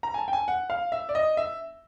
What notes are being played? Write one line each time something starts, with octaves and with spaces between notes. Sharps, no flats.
A#5
G#5
A5
G5
G#5
F#5
F5
E5
D5
D#5
E5